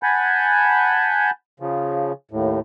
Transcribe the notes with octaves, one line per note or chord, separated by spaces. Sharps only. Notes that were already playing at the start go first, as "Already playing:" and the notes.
F#5 G#5 A5 B5 G6
C#3 F3
D#2 A2